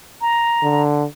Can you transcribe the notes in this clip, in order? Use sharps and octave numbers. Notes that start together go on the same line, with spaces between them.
A#5
D3